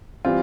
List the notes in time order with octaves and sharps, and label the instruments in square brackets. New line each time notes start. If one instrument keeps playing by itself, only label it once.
[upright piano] E3 G3 C4 [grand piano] F4